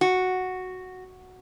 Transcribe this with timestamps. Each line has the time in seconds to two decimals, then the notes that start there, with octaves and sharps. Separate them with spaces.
0.01 F#4